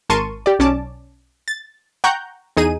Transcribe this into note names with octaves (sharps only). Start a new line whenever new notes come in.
G#1 A#4 A5 C6 C#6 D#7
G4 D5
B1 C#4 D5 A5 D6
A6
F#5 G5 A#5 C#6 F#6 G6
E2 D#4 G#4 D#7